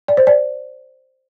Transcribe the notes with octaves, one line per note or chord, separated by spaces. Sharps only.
D5
C5
D5